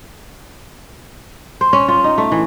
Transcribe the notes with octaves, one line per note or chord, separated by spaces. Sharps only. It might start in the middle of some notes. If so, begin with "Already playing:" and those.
C5
C#4
F4
D#4
A3
E3